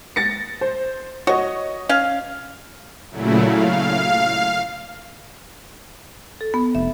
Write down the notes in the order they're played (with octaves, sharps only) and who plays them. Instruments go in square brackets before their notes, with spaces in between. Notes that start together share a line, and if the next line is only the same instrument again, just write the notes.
[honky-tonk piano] A6 A#6 C#7
C5
[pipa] F#4 [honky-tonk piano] C#5 D#5
[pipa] C#4 F5
[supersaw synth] A#2 C#3 F#3 A3 E4
F5
[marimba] A4
B3
[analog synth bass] F1 [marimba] E5